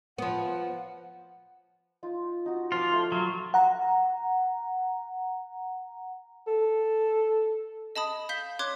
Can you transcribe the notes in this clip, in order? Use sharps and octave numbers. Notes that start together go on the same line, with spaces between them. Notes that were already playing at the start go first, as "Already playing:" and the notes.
F3 B3 F#5
D#4 F4
D#4 F#4
F3 F4 C6 D6
A3 C5
F#3 A#5
F#5 A#5
A4
D#5 A5 B5 D#6
F5 G6 B6 G7
C#5 C6 D6 F#6 G#6